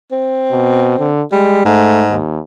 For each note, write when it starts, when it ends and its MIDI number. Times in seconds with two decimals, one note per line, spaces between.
0.12 1.09 60
0.51 0.95 47
0.99 1.22 50
1.32 1.64 55
1.32 1.61 56
1.65 2.16 44
1.65 2.05 57
2.11 2.39 39